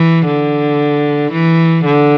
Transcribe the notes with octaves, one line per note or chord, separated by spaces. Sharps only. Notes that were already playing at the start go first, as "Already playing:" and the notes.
Already playing: E3
D3
E3
D3